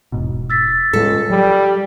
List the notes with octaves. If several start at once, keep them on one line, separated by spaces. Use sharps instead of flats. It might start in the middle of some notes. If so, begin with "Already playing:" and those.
E1 G#2 B2
E6 A6 B6
C#2 A2 G3 G#3 A4
F#3 G3